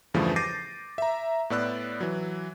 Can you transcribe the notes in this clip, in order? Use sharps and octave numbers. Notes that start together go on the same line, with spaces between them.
E2 G2 C#3 E3 F3 A3
D6 G6 A6 A#6 C7 D#7
E5 A#5
A2 B3 D5 E6 F#6
E3 F#3